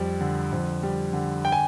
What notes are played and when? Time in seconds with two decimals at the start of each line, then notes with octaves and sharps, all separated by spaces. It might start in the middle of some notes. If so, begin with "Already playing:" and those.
Already playing: F2 G3
0.21 D3
0.52 F2
0.83 G3
1.13 D3
1.45 G5
1.52 G#5